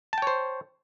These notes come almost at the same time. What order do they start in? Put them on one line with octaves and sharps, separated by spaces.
A5 G5 C#5 C5